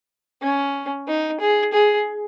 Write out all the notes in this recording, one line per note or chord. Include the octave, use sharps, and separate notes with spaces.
C#4
D#4
G#4
G#4